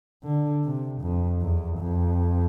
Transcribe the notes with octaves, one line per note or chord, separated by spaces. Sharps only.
D3
C3
F2
E2
F2